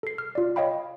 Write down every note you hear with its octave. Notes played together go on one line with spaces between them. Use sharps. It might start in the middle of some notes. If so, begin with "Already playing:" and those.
A4 C7
F6
F4 D5
C#5 D#5 F5 G5 B5